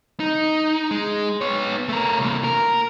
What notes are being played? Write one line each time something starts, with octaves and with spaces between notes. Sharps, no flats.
D#4
G#3
B3 C#5
A3 A#4
C2 A#3
A#4